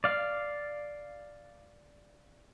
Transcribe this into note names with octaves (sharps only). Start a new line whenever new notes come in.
D5 F5